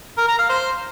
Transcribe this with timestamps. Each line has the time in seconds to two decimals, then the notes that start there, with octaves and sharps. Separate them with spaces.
0.18 A#4
0.28 A#5
0.39 F5
0.49 C5